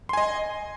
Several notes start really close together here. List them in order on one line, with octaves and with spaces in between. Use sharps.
C6 G#5 D#5